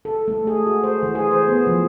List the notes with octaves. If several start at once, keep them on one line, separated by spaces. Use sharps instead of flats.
A4
A3
G#4
F#4
C5
E3
G#4
C5
B3
F3